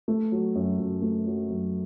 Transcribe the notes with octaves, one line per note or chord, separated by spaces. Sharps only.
A3
F#3
F#2
F#2
A3
F#3
F#2